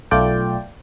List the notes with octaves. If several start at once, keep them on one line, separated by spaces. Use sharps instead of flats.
B1 A3 F4 D5 G5